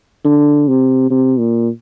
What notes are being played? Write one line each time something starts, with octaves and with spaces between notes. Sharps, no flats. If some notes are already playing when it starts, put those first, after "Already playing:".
D3
C3
C3
A#2